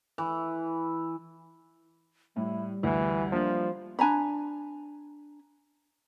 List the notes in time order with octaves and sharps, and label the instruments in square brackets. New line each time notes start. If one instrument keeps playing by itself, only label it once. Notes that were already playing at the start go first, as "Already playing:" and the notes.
[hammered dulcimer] E3
[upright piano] A2 [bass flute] G3 [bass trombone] E4
[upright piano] D2 [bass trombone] E3
[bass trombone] F3 [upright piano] A#3 D4
[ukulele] D4 G#5 A#5 B5